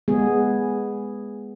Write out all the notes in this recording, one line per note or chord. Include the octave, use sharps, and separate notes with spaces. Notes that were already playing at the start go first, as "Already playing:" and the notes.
G#3 B3 G#4